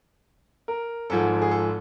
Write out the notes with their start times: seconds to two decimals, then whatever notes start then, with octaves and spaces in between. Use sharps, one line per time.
0.68 A#4
1.10 G#1 G#2 F3 A4
1.42 G#4
1.51 A4